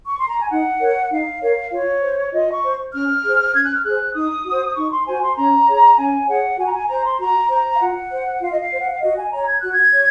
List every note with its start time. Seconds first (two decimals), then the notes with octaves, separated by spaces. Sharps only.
0.06 C#6
0.18 C6
0.28 A#5
0.39 G#5
0.50 D#4 F#5
0.80 A#4 C#5
1.11 D#4 F5
1.41 A#4 C#5 F5
1.71 F4 C#5
2.02 C5
2.33 F4 D#5
2.52 C#6
2.63 C5
2.94 C#4 F6
3.24 G#4 C5
3.54 C#4 G#6
3.64 F#6
3.74 F6
3.83 G#4 C5 F#6
4.15 D#4 D#6
4.45 F#4
4.50 C5
4.75 D#4 C#6
4.92 C6
5.06 F#4 C5 G#5
5.22 C6
5.37 C#4 A#5
5.68 G#4 C#5
5.98 C#4 G#5
6.28 G#4 C#5 F#5
6.58 F#4 G#5
6.66 A#5
6.73 G#5
6.89 C5 A#5
7.04 C6
7.19 F#4 A#5
7.50 C5 A#5
7.75 F5
7.80 F4 F#5
8.11 C5
8.41 F4 F5
8.50 D#5
8.59 F5
8.71 C5
8.80 F#5
8.91 F5
9.02 F#4 D#5
9.17 G#5
9.32 C#5 A#5
9.47 G#6
9.60 F#4 F#6
9.72 G#6
9.93 C#5